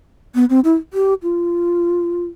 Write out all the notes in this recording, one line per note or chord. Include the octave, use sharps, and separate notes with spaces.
B3
C4
E4
G4
F4